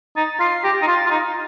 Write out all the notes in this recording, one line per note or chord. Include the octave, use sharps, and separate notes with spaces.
D#4 A6
F4 C7
G4 A#6
D#4
F4 A6
F4
D#4